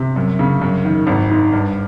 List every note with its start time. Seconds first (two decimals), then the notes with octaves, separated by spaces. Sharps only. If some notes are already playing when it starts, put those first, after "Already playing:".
Already playing: C3
0.16 F#2
0.39 C#3
0.62 F#2
0.85 D#3
1.07 G#1
1.30 G#2
1.52 G2